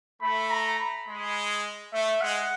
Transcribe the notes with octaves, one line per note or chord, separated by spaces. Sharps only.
A3 B5
A#5
B5
G#3
A3 E5
G#3 F#5